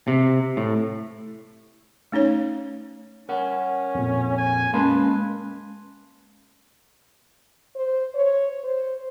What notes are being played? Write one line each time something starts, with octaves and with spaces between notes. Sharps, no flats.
C3
A2
A3 C#4 D#4 C#5
C#4 A#4 F#5
F2 A#2
G#5
G#3 A#3 C#4 B4 A5 C6
C5
C#5
C5